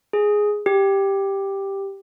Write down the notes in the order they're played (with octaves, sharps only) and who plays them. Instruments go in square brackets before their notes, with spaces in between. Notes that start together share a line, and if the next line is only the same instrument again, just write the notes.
[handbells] G#4
G4